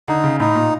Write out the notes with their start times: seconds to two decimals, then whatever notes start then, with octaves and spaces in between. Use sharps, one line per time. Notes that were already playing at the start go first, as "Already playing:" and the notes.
0.08 D3 D#4
0.24 C#3
0.40 A2 D#4
0.55 A#2